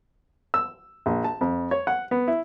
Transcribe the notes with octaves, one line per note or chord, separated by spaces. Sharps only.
E6
A#1
A5
F2
C#5
F#5
B3
E4